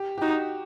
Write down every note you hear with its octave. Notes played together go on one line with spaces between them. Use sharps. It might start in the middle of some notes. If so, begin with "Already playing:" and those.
Already playing: G4
G4
D#4 F#4